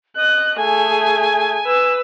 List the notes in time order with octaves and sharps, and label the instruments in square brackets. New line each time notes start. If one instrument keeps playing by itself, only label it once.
[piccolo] D#5 [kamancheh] F#6
[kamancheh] A3 G#4 [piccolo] G#5
[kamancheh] B4 E6